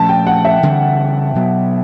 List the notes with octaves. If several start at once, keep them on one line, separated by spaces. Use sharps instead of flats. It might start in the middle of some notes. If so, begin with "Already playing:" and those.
Already playing: A#2 F3 A3 C#4 A5
G5
F#5
E5
C#3 E3 G3 C4
B2 F#3 B3